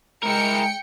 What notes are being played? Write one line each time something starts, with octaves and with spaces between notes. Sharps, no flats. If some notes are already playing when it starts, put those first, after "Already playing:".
G#3 E4 A#4 G5 C#7